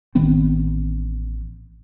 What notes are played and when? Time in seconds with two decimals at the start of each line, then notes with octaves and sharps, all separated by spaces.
0.15 A1 D#3 B3 C4